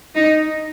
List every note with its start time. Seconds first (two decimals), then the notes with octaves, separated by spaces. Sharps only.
0.15 D#4